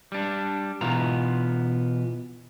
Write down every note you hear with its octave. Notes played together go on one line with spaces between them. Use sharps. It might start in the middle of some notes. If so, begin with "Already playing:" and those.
G3 D4
B2 E3 B3 F4 A#5